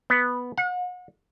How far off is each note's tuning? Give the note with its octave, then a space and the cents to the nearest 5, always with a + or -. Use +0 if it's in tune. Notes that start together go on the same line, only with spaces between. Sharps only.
B3 +0
F#5 -40